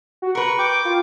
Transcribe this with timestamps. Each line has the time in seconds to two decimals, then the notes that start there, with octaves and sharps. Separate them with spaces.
0.22 F#4
0.35 A#4 B4 C#6
0.59 G5 D6
0.85 F4